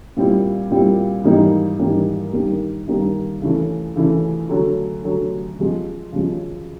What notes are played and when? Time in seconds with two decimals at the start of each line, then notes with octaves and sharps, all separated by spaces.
0.17 A#2 G3 C4 E4
0.71 A#2 G3 C4 E4
1.24 G#2 E3 G3 A#3 D#4
1.78 G#2 E3 G3 A#3 D#4
2.33 G2 D#3 G3 A#3
2.87 G2 D#3 G3 A#3
3.42 C#3 E3 A3
3.96 C#3 E3 A3
4.49 D3 F#3 A3
5.04 D3 F#3 A3
5.59 C#3 F3 G#3
6.12 C#3 F3 G#3